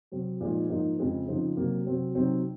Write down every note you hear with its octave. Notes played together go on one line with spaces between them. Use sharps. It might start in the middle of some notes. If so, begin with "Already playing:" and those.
C3 F#3 C4
A#2 F3 G#3 D#4
G#2 F3 A#3 D#4
F2 C#3 G#3 C4
C#3 F3 C4 D#4
C3 F#3 A#3
C3 F#3 C4 F#4
C3 F#3 C4 D#4